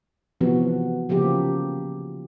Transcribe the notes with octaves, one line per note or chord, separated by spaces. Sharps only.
C3 E3 F3 B3 F#4
C#3 F3 A#3 G4